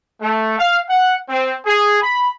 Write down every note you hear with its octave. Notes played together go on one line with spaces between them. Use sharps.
A3
F5
F#5
C4
G#4
B5